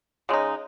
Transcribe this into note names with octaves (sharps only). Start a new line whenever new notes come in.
C#3 G#3 D#4